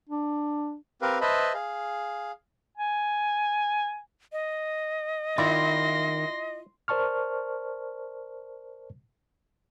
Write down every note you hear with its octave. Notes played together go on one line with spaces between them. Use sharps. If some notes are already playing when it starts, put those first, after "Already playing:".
D4
C4 G4 A#4 B4 F5
B4 C5 D#5 E5 A5 B5
G#4 F5
G#5
D#5
D#3 E4 F4 D5 C6 A#6
A#4 C5 D5 A5 C#6 F6